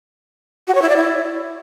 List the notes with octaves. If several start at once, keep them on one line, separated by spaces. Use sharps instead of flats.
F#4
C#5
E4
D5
E4